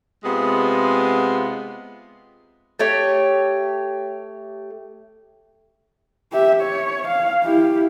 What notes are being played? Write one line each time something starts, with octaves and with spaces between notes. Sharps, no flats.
C3 G#3 B3 F4
A3 G4 C#5
G4 E5
C#5
F5
E4 G4